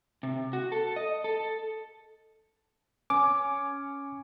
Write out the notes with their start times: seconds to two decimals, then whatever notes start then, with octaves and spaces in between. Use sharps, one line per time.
0.23 C3
0.53 F#4
0.72 A4
0.96 D#5
1.24 A4
3.10 C#4 D6